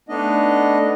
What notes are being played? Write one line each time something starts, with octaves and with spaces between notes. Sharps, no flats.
A3 B3 D4 D#4 D#5